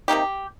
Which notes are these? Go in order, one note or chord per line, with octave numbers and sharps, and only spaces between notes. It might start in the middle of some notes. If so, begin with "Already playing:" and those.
C3 D#3 A#3 D#4 G4